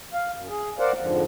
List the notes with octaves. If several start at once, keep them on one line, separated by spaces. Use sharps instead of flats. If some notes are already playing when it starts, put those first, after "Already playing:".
F5
F#2
G#4
A#4 C5 D5 F5 F#5
F2 G#2 D3 F3